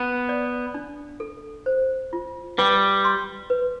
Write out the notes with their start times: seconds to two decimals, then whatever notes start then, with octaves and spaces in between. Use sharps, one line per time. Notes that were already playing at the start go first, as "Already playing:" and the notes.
Already playing: B3
0.29 D5
0.74 D4
1.20 A4
1.66 C5
2.13 F4
2.58 G3 B4
3.04 C6
3.50 B4